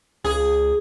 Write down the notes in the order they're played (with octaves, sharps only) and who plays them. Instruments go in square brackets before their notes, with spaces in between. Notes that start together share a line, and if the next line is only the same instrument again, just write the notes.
[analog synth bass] C#2 [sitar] G#4